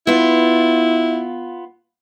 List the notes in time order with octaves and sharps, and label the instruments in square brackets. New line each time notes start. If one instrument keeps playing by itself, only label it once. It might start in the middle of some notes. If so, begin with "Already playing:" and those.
[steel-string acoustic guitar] B3 F4 [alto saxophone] E4